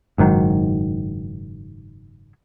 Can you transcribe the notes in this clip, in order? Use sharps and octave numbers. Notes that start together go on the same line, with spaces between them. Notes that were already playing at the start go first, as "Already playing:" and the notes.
F#1 G#2 D#3 F#3